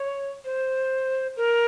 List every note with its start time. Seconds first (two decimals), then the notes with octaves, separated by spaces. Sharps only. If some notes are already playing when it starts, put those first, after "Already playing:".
Already playing: C#5
0.45 C5
1.37 A#4